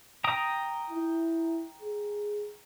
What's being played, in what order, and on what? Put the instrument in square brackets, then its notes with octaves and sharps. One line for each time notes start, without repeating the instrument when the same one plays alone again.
[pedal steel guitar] G5 A#5 D#6
[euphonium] E4
G#4